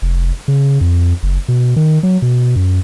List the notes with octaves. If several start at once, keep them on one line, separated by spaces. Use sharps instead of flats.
F1
C#3
F2
F#1
B2
D#3
F#3
B2
F#2